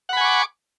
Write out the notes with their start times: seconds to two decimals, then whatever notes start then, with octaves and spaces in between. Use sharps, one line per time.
0.09 F#5
0.13 B5
0.17 G#5
0.21 C#6
0.25 D6